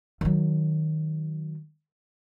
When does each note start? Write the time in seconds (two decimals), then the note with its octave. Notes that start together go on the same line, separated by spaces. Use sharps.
0.21 D#3 F#3